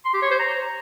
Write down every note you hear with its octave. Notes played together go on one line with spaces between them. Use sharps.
C6
G4
C#5
C5
A#5